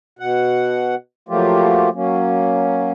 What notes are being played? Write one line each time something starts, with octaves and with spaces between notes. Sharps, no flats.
B2 F#5
F3 F#3 A3 A#3 F4 G4
F#3 A#3 C#4